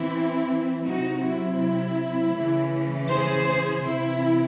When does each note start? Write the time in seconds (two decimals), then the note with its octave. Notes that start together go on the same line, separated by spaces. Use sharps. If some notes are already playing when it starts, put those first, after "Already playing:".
Already playing: E3 C4 E4
0.85 C3 F#3 C4 D#4 F#4
1.22 E4
2.34 C#3 E3 A3 C#4
3.08 G#4 C5
3.83 C3 E3 C4 E4